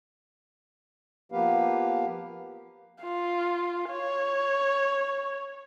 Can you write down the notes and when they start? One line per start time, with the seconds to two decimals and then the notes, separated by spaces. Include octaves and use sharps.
1.32 F3 A#3 B3 G4 B4 F5
3.02 F4
3.90 C#5